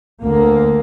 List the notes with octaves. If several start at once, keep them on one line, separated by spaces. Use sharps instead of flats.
D2 A#3